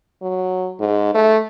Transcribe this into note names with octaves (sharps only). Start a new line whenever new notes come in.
F#3
G#2
A3